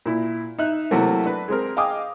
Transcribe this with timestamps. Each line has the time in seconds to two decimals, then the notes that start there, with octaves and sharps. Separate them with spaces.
0.06 A#2 E4
0.59 D#4 E5 F#6
0.91 C3 E3 F#3 A3 A#3
1.26 D4 B4
1.48 G#3 C4 A#4
1.77 D#5 F5 G5 G#5 D6 D#6